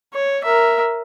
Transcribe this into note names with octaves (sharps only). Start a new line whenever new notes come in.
C#5
A#4 E5